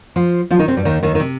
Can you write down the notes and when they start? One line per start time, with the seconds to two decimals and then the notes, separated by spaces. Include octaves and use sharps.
0.16 F3 F4
0.50 F3 F4
0.59 D#3 D#4
0.68 C3 C4
0.77 G2 G3
0.85 D#2 D#3
1.03 D#2 D#3
1.15 D#3
1.20 C3